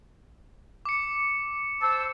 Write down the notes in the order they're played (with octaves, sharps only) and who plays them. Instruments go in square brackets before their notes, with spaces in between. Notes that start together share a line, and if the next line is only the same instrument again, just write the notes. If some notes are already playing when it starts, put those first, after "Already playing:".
[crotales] D6 C#7
[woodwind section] C5 A5 E6